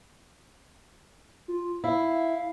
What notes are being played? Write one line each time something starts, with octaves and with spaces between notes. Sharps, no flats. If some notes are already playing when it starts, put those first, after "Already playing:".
F4
E4 F5